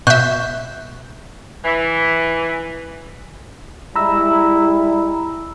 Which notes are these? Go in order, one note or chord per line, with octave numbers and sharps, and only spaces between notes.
B2 E5 C#6 F#6 G6
E3
G3 G#3 E4 A#5 B5 E6